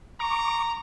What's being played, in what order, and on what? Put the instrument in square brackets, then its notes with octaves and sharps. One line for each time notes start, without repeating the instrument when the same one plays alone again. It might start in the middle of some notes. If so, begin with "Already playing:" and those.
[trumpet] A#5 [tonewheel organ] C#6 D6